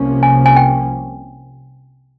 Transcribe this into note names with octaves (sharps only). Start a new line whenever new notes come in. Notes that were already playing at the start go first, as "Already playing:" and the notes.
Already playing: C2 C3 F3 A#3 C#4
G#5
G#5
G5